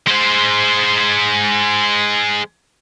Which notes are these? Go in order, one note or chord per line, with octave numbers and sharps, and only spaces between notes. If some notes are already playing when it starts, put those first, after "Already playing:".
G#3 C5